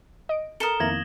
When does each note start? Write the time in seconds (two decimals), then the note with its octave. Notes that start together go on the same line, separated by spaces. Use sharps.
0.29 D#5 D7
0.60 A4 A#4 D#6 E7 G7
0.80 F2 D#3 A#3 B3 E4 G#6 A#6 F#7